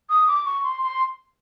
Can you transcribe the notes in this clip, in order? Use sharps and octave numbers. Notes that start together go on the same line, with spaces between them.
D#6
D6
C#6
C6
C6